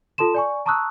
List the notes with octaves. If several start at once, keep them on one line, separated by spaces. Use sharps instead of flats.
F4 A4 A5 C6 E7
D5 G#5 C#6
A5 A#5 C#6 D#6 E6 F#6